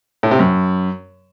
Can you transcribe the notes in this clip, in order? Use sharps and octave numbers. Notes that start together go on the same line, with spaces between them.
A2
C3
F#2